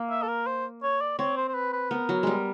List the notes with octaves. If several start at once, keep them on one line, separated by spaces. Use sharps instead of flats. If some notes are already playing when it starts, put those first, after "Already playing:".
Already playing: A#3
E5
A4
A#4
C5
C#5
D5
C4 C#5
C5
C5
B4
B4
B3 A#4
F#3
G3 G#3